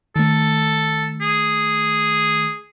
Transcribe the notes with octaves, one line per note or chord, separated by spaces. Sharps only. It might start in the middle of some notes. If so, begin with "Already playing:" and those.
D#3 A3 A4
G#4